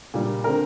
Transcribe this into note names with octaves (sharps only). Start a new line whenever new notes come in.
A#2 G3 A#3
D3 A3 C4 A#4